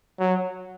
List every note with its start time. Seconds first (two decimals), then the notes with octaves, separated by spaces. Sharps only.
0.19 F#3